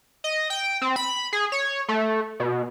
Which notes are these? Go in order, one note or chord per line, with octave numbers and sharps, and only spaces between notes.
D#5
G5
C4
B5
G#4
C#5
A3
B2